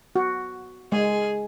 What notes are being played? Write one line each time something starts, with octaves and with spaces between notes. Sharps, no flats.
F#4
G#3 G#4